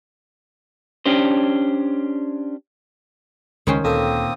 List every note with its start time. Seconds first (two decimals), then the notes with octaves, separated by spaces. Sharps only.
1.06 C#4 D4 G4 C5
3.67 C#2 D#3 C#4 C5
3.84 D2 A#2 A#3 C4 A4 G5 D#6